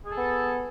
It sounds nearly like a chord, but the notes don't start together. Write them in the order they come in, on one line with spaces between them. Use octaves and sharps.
G#4 A4 B3